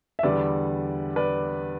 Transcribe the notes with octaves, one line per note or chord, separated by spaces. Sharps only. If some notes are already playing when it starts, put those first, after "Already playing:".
E5
E2 D3 G3 B4 D5
B4 D5